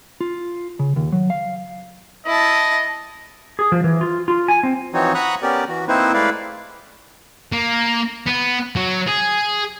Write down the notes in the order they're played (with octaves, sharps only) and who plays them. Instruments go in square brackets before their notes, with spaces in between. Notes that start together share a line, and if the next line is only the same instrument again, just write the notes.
[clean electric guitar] F4
C#3
D#2
F#3
F5
[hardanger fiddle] E4 A5 [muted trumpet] D#5
[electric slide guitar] G#4
F3
E3
F4
F4
G#5
C4
[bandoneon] E3 F3 C4 D#4 F#4 C#5
F#5 A#5 B5 C#6 D#6 F#6
B3 C#4 G4 A#4 D5
E3 F#4
A#3 C4 D#4 E4 B4 C5
G#3 A3 E4 B4 D5 F5
[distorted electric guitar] A#3
B3
F#3
G#4